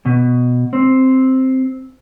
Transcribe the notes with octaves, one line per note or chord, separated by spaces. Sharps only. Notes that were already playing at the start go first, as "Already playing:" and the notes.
B2
C4